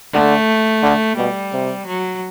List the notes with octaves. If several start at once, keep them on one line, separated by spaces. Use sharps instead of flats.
D3 A3
D3
B2 G3
C3
F#3